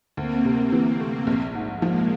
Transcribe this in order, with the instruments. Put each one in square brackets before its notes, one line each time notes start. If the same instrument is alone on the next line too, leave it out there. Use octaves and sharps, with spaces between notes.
[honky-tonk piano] D2 [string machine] A#3 C4
[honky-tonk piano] C3
E3
A3
A#1
G#2
[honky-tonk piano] F3 [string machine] G#3 A#3